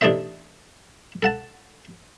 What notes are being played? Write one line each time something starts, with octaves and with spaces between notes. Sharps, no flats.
A1 D4 D#4 A4 C5 E5
A4 F#5 A5